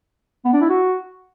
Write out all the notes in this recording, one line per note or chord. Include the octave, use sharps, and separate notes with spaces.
B3
D4
E4
F#4